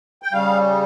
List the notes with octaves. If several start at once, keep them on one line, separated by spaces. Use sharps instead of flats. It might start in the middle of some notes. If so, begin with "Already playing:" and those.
G5
C#3 G3 F5